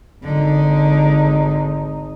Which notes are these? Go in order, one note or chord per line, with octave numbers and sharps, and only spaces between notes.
G#1 D3 D#4